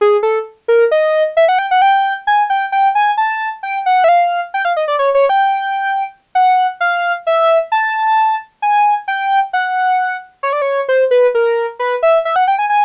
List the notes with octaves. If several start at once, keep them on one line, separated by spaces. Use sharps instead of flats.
G#4
A4
A#4
D#5
E5
F#5
G5
F#5
G5
G#5
G5
G5
G#5
A5
G5
F#5
E5
F5
G5
F5
D#5
D5
C#5
C#5
G5
F#5
F5
E5
A5
G#5
G5
F#5
C#5
D5
C#5
C5
B4
A#4
B4
E5
E5
F#5
G5
G#5
G#5